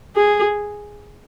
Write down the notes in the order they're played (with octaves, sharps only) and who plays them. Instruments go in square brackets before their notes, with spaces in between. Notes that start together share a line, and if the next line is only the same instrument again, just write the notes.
[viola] G#4